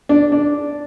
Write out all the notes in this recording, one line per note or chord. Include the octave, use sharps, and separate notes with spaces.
D4
D4